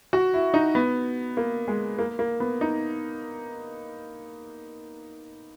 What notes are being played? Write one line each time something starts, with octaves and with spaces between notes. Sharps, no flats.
F#4
E4
D#4
B3
A#3
G#3
A#3
A#3
B3
D#4